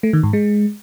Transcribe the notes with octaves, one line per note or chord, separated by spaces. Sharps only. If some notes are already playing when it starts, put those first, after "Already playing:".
A3
D#3
G#2
G#3